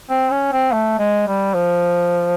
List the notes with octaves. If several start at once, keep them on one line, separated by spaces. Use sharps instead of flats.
C4
C#4
C4
A3
G#3
G3
F3